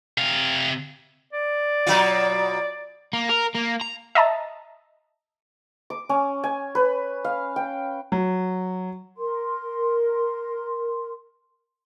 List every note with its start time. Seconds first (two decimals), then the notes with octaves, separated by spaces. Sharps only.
0.18 C3 F5
1.33 D5
1.87 B2 F#3 F4
3.13 A#3
3.30 A#4
3.55 A#3
3.81 A#5
4.15 D#5 E5 A5 A#5
5.90 D6
6.09 C#4
6.44 G#5
6.75 B4
7.25 F5
7.56 G5
8.12 F#3
9.17 A#4 C6